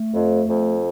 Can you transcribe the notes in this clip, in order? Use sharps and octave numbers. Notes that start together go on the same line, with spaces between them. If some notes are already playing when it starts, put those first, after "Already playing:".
Already playing: A3
F2
F2